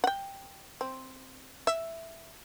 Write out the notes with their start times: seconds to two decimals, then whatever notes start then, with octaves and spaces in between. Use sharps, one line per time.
0.04 F#5 G5
0.81 C4
1.67 E5